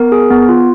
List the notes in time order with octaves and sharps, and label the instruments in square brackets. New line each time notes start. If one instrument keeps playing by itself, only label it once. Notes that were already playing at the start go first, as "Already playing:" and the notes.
Already playing: [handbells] B3 A#4
G#4
B3
F4